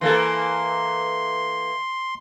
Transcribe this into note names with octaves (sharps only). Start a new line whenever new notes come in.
E3 A#3 A4 C6